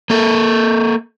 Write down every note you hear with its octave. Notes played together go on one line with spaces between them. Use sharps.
A#3 A4